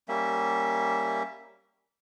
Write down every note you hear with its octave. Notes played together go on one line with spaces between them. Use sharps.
G3 A#3 C#4 E5